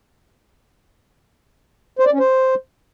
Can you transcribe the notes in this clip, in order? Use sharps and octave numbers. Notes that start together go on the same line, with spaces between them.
C5
D5
C#4
C5